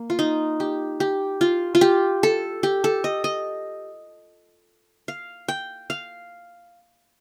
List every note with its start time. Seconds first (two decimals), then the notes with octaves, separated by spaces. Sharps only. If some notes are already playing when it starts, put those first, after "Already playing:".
Already playing: A#3
0.10 F4
0.19 D#4
0.60 G4
1.00 G4
1.41 F4
1.75 F4
1.81 G4
2.23 A4
2.63 G4
2.84 A4
3.04 D#5
3.24 D#5
5.08 F5
5.48 G5
5.90 F5